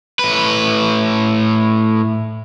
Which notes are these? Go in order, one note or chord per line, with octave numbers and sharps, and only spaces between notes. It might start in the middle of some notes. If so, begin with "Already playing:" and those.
A2 B4